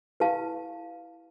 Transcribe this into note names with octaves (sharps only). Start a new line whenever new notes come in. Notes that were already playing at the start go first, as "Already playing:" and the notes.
E4 G4 B4 F5 A5